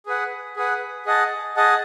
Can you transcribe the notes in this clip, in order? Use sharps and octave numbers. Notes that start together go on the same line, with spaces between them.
G#4 B4 F#5
G#4 B4 F#5
G#4 D#5 F#5 A5
G#4 D#5 F#5 A5